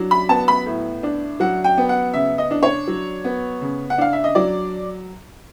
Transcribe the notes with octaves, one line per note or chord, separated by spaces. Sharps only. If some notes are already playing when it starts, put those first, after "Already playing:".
Already playing: F#3 D4
B5
B3 A5
B5
A2
D4
F#3 F#5
G5
B3
F#5
C#3 E5
D#5
D4
C#5
F#3
B3
C#3
F#5
D4 F5
E5
D#5
F#3 D5